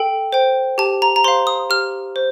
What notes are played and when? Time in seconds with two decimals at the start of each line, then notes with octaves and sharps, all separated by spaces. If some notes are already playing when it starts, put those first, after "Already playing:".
Already playing: A4 G5
0.33 C5 G5
0.78 G4 A5
1.02 A#5
1.16 A#5
1.24 C5 F5 C6
1.47 D#6
1.70 G4 F6
2.16 C5